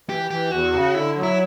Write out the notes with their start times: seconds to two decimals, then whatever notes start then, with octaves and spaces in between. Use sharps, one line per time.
0.09 E3 G4
0.30 E3 G4
0.51 E2 F#4
0.74 C#3
0.94 D3 E4
1.16 F#3
1.23 E4